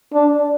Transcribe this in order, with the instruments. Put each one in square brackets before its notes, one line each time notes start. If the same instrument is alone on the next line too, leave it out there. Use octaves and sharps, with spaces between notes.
[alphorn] D4